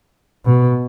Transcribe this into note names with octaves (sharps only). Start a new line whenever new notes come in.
B2